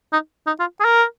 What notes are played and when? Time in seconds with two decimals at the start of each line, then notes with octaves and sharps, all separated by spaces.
0.13 D#4
0.47 D#4
0.60 F4
0.80 G#4
0.85 A#4